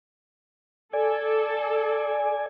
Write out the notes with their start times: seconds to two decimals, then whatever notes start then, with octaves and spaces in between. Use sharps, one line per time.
0.93 A4 D5 G#5